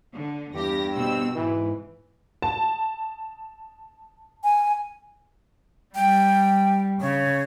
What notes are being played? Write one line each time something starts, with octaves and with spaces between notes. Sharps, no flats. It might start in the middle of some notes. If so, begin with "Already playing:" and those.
D3
E2 G2 G4 A#6
B2 C4 E6
G#2 E3
A5
G#5
G3 G5
C#3 C#5